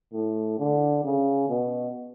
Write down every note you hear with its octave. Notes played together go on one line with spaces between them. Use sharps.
A2
D3
C#3
B2